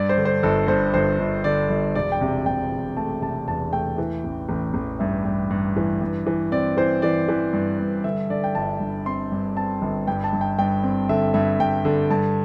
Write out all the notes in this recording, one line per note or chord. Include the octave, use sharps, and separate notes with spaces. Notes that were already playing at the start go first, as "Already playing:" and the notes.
Already playing: G2 D5
C5
D3
C5
G1 A4
G2 C5
G1 C5
G1
D3 D5
G1
E1 D5
G5
C3
C3 G5
E1
A3 A5
C3 A5
E2 A5
A3 G5
E3
A1
A1
A1
G2 E5
G2
G2
E3
G2
E3
C4 D5
E3 C5
E3 D5
E3
G2
G2
D3 E5
D3 D5
G5
G1 A5
G2
C4 C6
G2
C4 A5
G1
G2 G5
A5
G2
G5
G2 G5
C4
D3 E5
G2 E5
G2 G5
D3
G2 A5